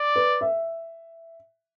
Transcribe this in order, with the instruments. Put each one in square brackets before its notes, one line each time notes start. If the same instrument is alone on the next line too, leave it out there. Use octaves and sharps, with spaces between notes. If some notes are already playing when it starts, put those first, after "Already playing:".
Already playing: [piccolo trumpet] D5
[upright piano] B4
E5